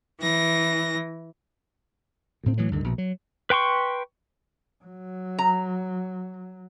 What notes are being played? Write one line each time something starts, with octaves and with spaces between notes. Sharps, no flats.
E3 A#6
D2 A2 C4
A2 E3 F#3
D2 G2 D3 D#3
A#1 B2
F#3
B4 G5 C6 C#6
F#3
A#5